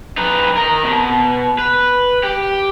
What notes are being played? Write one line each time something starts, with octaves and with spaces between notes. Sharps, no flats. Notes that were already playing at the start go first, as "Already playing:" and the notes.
D#4 B4
A#4 D#5
B2
B4
G4